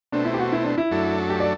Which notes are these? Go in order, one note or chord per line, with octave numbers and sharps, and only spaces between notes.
B2 A3 C4 D4
E4
G4
F#4
E4
D4
E4
F#2 F#3 A3 D4 A4
G4
D5